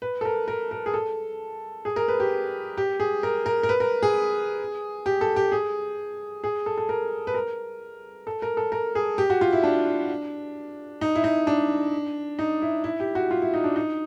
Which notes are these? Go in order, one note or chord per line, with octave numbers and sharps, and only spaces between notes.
B4
A4
A#4
A#4
A#4
G#4
A4
G#4
A#4
B4
G4
G4
G#4
A#4
A#4
A#4
B4
A#4
G#4
G4
A4
G4
G#4
G#4
A4
A4
A#4
B4
A#4
A4
A#4
A4
A#4
G#4
G4
F#4
F4
E4
D4
D#4
E4
D#4
D4
D#4
E4
E4
G4
F#4
F4
E4
D#4
D4
D#4